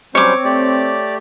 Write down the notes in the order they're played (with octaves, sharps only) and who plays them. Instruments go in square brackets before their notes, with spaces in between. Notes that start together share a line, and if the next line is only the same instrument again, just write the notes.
[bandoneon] F#3 G3 C#4 [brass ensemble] C4 [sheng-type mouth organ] C5 [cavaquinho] C#5 D6
[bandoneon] A3 G4 [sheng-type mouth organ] D5